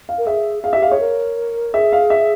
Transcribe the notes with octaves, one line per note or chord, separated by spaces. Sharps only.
F5
A#4
G#4 E5
G#4 F5
G4 E5
F5
G#4 C#5
A#4
G#4 E5
F5
E5